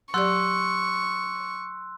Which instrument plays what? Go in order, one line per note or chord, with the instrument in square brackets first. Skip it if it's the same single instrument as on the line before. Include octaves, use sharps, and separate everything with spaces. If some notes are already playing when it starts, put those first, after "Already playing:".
[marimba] F#3 G4 D5 [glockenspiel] C6 E6 F#6 [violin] C#6